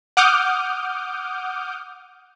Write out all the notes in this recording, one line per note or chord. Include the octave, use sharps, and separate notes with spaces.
F#5 D6 D#6 F6 G6